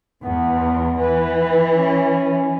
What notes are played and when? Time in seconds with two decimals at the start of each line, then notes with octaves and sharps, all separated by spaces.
0.23 E2 B3
0.99 E3 B4
1.73 C#4